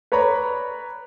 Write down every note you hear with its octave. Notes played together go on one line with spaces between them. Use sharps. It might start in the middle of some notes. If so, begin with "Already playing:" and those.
B4 C#5 D5 A#5 B5